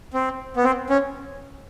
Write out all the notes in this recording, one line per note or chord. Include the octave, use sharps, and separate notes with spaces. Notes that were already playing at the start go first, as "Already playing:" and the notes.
C4
B3
C4
C#4